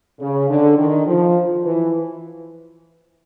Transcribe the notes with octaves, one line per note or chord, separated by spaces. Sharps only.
C#3
D3
D#3
F3
E3